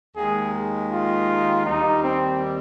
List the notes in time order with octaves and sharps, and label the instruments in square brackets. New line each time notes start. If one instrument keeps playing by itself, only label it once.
[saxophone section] D#2 D#3 G#3 [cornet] G#4
[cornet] F4
[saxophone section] D#2 D#3 G3 [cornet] D#4
[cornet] C4